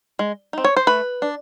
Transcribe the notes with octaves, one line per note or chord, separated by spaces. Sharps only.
G#3
C4 D#4
C#5
C5
A3 B4
D4